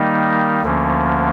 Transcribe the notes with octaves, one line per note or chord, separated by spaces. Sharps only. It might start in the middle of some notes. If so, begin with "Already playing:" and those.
Already playing: D#3 G3 A#3 D#4
D2 D3 F3 A#3 C#4